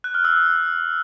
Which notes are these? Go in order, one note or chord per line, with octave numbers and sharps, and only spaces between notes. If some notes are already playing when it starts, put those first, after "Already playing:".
F#6
F6
E6